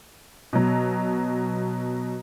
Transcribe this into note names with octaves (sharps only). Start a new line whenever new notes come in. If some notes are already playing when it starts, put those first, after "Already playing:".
B2 F#3